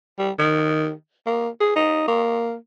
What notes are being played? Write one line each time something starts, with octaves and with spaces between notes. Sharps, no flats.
G3
D#3
A#3
G#4
D#4
A#3